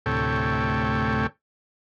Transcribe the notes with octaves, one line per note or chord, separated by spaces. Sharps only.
D2 A2 C3 A4 C#5 G5